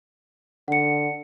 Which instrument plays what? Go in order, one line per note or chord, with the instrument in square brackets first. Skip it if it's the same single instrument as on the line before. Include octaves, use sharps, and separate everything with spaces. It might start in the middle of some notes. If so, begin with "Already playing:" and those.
[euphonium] D3 [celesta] F#5 C#7